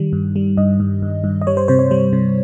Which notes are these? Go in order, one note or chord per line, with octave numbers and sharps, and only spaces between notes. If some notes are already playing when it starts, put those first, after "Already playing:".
Already playing: D#3 G3
G2
G3
G2 D#5
G2
G2
G2
D#5
G3 C#5
C5
C3 C5
C#5
G3 C5
C3